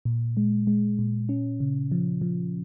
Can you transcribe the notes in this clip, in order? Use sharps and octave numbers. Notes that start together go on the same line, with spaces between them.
A#2
G#3
G#3
A#2
C#4
C#3
F3
F3